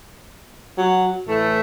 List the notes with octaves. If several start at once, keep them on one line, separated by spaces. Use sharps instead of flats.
F#3
A2 E3 A3